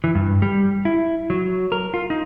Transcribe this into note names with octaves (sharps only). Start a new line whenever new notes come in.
E3
G2
G3
E4
F#3
A#4
F4
D#4